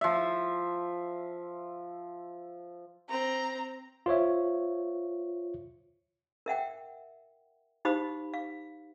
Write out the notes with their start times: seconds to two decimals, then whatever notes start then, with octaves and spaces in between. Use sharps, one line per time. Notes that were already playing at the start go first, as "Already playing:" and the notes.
0.01 F3 E5
3.10 C4 A#5
4.06 F4 C5 C#5 E5
6.46 A#4 E5 F#5 G5
7.85 D#4 G4 C5 F5 B5 D#6
8.34 F5